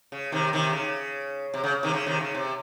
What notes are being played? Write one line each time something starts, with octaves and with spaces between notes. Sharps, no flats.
C#3
C3 D#3
C3 D#3
C#3
C3
C#3
C3 D#3
C#3
C3 D#3
C#3
C3